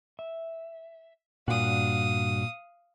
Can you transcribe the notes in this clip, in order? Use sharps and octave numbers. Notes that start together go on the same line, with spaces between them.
E5
G2 A#2 D4 F#4 F5 D#6